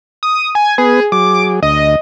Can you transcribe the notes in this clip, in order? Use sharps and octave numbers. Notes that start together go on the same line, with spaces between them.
D#6
G#5
B3 G#4 B4
F#3 G#4 D6
D2 D#5